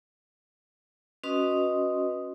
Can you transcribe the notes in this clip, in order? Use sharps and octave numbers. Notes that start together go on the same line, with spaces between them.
C#4 F#4 B4 D#5 C6 D#6